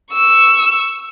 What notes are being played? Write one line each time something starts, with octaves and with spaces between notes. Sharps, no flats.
C#6 E6